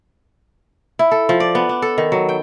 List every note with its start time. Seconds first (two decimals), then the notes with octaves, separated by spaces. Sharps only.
0.99 E4
1.12 A4
1.29 F3
1.40 D5
1.55 B3
1.69 D4
1.82 A4
1.98 D#3
2.12 F#3
2.29 G5